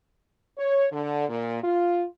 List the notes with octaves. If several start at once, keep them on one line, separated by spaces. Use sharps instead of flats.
C#5
D3
A#2
F4